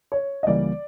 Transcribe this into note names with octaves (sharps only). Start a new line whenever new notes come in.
C#5
D#5
C#2 C#3 E3 G3 A#3 D5